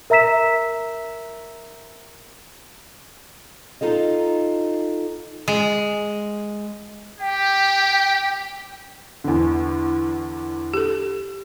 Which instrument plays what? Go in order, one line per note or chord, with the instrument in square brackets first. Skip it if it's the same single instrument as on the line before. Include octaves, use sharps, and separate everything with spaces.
[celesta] A#4 E5 A#5 E6 B6 E7
[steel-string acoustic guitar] D#4 F4 A4 D#5
[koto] G#3
[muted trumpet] G4 [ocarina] G5
[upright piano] E2 D3
[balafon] G4 A4